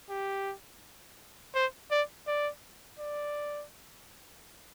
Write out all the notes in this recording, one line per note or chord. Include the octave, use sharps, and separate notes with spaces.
G4
C5
D5
D5
D5